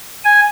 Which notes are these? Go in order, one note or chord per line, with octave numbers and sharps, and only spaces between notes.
G#5